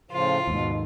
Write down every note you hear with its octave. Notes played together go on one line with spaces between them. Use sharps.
A2 C#3 F3 F4
D#2 G#2 B2